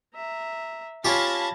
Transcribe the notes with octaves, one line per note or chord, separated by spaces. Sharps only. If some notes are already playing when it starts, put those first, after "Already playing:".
E5 A#5
C#4 F4 G4 F5 A5 B5 G#6 A#6